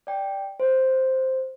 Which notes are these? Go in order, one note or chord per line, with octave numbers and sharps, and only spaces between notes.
D5 G5
C5